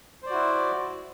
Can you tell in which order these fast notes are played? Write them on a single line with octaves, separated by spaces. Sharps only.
C5 D5 F#4 E4